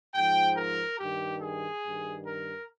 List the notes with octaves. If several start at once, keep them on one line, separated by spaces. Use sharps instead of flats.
G#2 F3 G5
A#4
G2 D#3 G4
G#4
G2 D#3
A#4